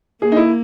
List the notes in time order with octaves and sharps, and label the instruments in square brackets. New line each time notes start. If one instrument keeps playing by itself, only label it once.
[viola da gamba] A#3 [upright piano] G#4
[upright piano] D#4
E4